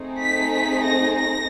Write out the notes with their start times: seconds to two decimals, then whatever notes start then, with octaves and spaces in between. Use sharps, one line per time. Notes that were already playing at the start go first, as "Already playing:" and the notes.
Already playing: A3 C4 D#4 G#4
0.22 B6
0.53 B6
0.84 A#6
1.15 A#6